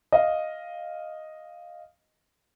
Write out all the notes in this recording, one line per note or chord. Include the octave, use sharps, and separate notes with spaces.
D#5 F5